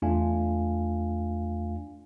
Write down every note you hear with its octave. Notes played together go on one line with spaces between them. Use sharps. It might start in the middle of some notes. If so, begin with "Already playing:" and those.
E2 A3 D4 F4 F5 G#5